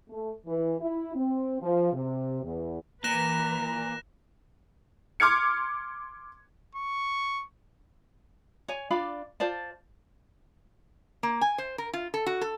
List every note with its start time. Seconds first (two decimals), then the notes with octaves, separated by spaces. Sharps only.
0.10 A3
0.46 E3
0.80 E4
1.15 C4
1.61 F3
1.93 C3
2.43 E2
3.04 A#2 E3 B4 A#5 F#6 A#6 E7
5.20 C6 D6 F6 G#6 C#7
6.75 C#6
8.68 C#5 G#5
8.90 D4 F4 D5 B5
9.40 F4 C5 D5 A5
11.23 A#3
11.41 G#5
11.58 C5
11.78 A#4
11.93 F4
12.14 A4
12.26 F#4
12.41 A4